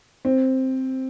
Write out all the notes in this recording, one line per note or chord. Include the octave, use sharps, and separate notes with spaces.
C4